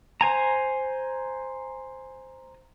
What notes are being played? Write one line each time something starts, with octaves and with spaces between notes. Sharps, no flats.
C5 G#5 A#5